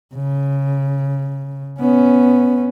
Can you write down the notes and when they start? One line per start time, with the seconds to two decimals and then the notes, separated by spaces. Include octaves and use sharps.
0.15 C#3
1.80 B3 C#4